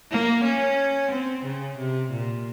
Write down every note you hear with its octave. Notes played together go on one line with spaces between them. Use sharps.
A#3
C#4
C4
C#3
C3
A#2